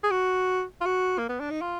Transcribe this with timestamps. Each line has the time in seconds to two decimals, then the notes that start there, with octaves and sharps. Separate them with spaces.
0.04 G#4
0.11 F#4
0.81 F4
0.86 F#4
1.18 A#3
1.29 B3
1.40 D4
1.50 D#4
1.61 F4